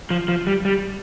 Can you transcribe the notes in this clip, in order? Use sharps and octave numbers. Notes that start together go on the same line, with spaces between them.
F3
F3
G3
G3